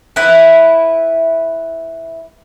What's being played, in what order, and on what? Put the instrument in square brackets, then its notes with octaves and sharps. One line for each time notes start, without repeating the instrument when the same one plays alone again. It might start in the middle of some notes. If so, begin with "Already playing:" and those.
[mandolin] E4 B4